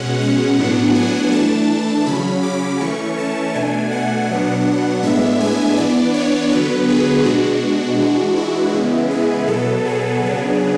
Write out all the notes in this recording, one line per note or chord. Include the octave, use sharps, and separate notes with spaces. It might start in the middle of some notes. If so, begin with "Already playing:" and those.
Already playing: B2 G#3 C#4 F#5
F#5
A2 F#3 B3 D4
G#5
E3 A3 D4 A5
C#3 F#3 C#4 B5
D6
E3 A3 C#4 C#6
A5
B2 A3 D4 G#5
F#5
B2 F#3 B3 D4
A2 G#3 B3 D4 E5
G#5
E3 B3 D4 D5
C#5
D3 F#3 B3 B4
G#4
B2 G#3 D4 F#4
E3 G#3 D4
E4
C#3 E3 G#3 B3
G#4
B2 F#3 B3 A4
G#4
C#3 F#3 B3 D4